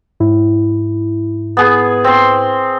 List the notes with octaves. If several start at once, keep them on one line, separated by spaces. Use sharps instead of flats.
G#2 E4
B3 G#4
C4 C6